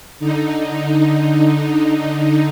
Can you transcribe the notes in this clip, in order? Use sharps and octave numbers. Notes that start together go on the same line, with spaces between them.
D3 D#4